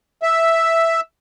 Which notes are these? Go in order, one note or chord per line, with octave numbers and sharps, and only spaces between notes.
E5